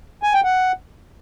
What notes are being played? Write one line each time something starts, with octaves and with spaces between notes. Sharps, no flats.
G#5
G5
F#5